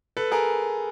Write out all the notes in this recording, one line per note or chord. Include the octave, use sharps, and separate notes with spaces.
A4 B4
G#4 A#4